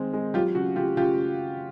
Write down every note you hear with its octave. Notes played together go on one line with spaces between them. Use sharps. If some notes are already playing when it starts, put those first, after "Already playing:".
Already playing: D#3 G#3 C4
G#3
F#3 F4 G4
C#3 F#4
C#3 F4 G4
C#3 F4 G4